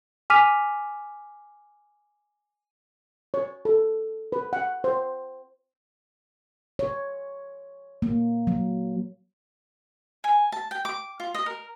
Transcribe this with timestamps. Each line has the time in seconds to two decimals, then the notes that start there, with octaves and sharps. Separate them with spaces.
0.30 G#5 D6 F6 B6 D#7 F7
3.34 C#5
3.65 A4
4.32 B4
4.53 F#5
4.84 C5
6.79 C#5
8.02 A#3
8.47 F#3
10.24 G#5
10.52 A5
10.71 G5
10.85 D6
11.20 F4
11.34 D#5
11.46 A#4